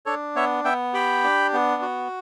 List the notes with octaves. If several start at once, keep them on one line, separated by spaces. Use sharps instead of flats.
D4 A4 C#5
B3 C#5 E5
B3 E5 G5
G4 G5 B5
D4
B3
F#4